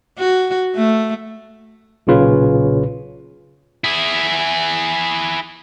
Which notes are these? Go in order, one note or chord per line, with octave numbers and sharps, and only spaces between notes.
F#4
A3
B1 A#2 C#3 F4 B4 C#5
E4 G#4